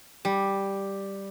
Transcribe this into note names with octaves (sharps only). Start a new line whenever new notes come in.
G3